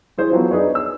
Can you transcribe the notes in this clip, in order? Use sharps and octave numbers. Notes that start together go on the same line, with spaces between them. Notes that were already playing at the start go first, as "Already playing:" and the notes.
E4 G#4 C5 C#5
F3 F#3 B3
D4 D#4 G#4 B4 C#5
E6